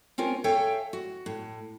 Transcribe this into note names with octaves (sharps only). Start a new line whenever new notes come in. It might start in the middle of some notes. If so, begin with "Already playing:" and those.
C4 C#4 F4 A#4
A4 C#5 E5 F5 G5 G#5
F#4
A2